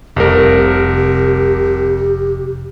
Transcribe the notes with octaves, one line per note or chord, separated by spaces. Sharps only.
F1 C2 G4 A#4